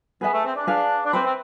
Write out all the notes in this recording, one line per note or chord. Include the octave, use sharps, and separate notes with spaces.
B3 G#4 B4 E5 G#5
A3
C4
D4
D4 G#4 B4 F5
D4
C4 B4 E5 B5
C4